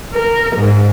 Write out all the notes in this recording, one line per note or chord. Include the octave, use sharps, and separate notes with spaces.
A#4
G#2